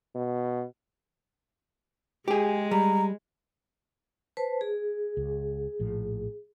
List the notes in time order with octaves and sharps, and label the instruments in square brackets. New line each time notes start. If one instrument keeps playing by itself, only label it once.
[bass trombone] B2
[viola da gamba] G#3 [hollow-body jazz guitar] G4 G#4
[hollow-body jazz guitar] G3 [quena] A#5
[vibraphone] B4 C5 A5
G#4
[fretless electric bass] C#2
A#1 A2 F3